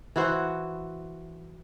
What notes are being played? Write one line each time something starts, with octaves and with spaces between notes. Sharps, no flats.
E3 E4 F#4 C5